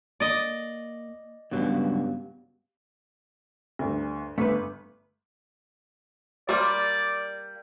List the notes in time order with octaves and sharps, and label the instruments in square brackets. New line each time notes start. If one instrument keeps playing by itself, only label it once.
[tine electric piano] A#3 [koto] D5 D#5
[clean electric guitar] C#2 G2 F#3 [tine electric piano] B3 G4 F5
[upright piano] D2 G2
[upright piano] G1 [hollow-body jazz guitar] A3 B4
[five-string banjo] G3 A#3 F4 [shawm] D5